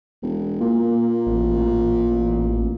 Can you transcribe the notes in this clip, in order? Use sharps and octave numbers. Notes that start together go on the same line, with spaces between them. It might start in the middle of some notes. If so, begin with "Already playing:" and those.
E1
A#2 A#3
A1